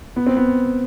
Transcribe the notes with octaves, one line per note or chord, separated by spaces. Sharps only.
B3
C4
B3